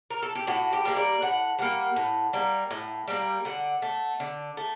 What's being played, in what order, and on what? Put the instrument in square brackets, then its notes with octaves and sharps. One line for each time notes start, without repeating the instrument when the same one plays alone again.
[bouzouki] A#4
A4
G4
A2 F#4
G4
G3 A#3
D5
A2 F#5
G3 A#3 F#5
A2
G3 A#3
A2
G3 A#3
D3 F#5
A3
D3
A3